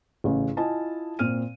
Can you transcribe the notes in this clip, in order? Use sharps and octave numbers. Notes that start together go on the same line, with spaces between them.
A1 C#3
E4 F4 D#5 G#5 A5
A#2 C4 F6 D#7